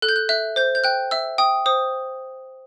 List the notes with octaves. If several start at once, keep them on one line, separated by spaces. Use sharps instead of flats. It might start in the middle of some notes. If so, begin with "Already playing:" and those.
A4 F#6
G6
F#6
E5 F#6
C5 G6
G6
G5 F#6
E5 E6
G5 D#6
C5 D#6